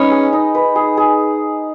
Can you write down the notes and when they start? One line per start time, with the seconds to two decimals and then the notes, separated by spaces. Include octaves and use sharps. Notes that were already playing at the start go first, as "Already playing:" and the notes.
Already playing: C#4 D#4 B4
0.11 G#4
0.33 D#4
0.55 B4
0.75 G#4
0.97 G#4